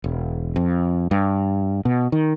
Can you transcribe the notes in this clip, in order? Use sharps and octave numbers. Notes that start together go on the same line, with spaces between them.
E1
F2
G2
B2
D#3